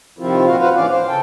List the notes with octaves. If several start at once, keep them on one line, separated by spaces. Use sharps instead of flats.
C3 D#3 F3 C4 E4 F4
A#2 D#3 C4 F#4 F5
F4 F#4 B4 C5 F5
D#2 G#2 E3 C#4 D5 F5
C5 F5
C#3 A4 G5